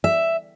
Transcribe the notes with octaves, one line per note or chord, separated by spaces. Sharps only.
E5